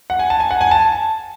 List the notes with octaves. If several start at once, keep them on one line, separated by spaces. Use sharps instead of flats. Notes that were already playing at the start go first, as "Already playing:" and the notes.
F#5
G#5
A5
G#5
F#5
G#5
A5